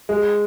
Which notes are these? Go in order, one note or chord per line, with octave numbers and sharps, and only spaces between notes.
G#3